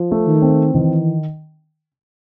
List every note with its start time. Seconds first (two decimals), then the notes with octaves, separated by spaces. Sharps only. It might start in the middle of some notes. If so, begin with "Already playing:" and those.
Already playing: F3
0.11 A3
0.27 D#3
0.42 C4
0.74 D#3 E3